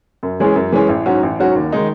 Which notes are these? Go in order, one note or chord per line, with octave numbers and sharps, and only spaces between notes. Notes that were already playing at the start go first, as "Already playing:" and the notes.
F#2
E3 G#3 C#4 G#4
F#2
E3 G#3 C#4 G#4
A1
G#2 F#3 C#4 F#4
A1
G#2 F#3 C#4 F#4
D#2
D#3 G#3 D#4